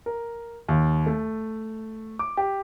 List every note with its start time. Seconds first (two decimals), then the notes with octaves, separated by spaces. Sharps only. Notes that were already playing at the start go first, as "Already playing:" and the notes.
0.06 A#4
0.68 D#2
1.06 A3
2.19 D6
2.37 G4